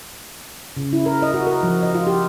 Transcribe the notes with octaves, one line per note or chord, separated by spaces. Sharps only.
C#3
E4
A#4
D#5
F#4
A#4
F3
D#5
F4
G4